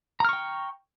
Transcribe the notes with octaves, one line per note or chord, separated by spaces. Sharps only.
G5 A#5 C#6 F6